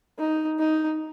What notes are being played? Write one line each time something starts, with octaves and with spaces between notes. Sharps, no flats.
D#4
D#4